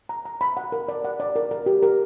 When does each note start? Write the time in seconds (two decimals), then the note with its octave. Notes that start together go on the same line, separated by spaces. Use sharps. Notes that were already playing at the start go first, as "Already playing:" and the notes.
0.09 A#5
0.25 A#5
0.41 B5
0.57 F#5
0.72 A#4
0.88 D5
1.04 F#5
1.20 D5
1.36 A#4
1.51 A#4
1.66 G4
1.82 A#4